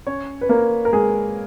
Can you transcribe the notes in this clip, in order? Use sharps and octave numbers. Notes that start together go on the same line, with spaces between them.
C#4 C#5
B4
A#3 A#4
A#4
G#3 G#4